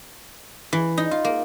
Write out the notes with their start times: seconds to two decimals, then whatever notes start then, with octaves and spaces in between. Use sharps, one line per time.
0.73 E3
0.97 D#4
1.11 F4
1.24 A#3